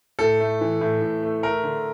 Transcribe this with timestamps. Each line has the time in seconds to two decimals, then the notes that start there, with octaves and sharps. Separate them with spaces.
0.19 A2 A4
0.40 A3
0.61 E3
0.81 A2
1.02 A2
1.23 A3
1.43 A3 A#4
1.64 D3